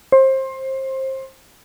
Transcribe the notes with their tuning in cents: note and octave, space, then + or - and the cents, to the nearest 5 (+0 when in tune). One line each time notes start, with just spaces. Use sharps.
C5 +25